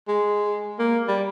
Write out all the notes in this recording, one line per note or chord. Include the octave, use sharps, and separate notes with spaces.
G#3
A#3
G3